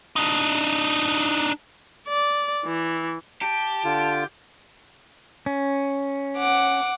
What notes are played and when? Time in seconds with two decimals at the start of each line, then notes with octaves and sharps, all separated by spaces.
0.16 D4 D#4
2.08 D5
2.66 E3
3.42 G4 A5
3.84 D3 F4
5.46 C#4
6.38 F#5 D6